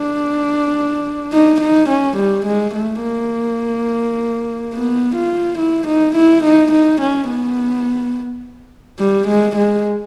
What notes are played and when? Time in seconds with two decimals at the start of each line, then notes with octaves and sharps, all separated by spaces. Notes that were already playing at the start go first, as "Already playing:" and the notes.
Already playing: D4
1.32 D#4
1.61 D#4
1.89 C#4
2.17 G3
2.46 G#3
2.74 A3
3.03 A#3
4.74 B3
5.16 F4
5.59 E4
5.87 D#4
6.16 E4
6.44 D#4
6.72 D#4
7.01 C#4
7.29 B3
8.99 G3
9.27 G#3
9.56 G#3